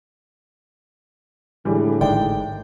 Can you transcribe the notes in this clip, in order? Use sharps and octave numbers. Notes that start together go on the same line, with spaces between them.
A2 D3 E3 G3 G#3
G#1 D#3 G#3 D5 G5